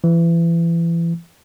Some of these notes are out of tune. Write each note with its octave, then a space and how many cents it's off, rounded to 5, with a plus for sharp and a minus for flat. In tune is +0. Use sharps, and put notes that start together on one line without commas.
E3 +30